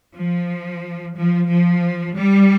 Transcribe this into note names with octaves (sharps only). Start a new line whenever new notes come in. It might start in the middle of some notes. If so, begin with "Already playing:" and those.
F3
F3
F3
G3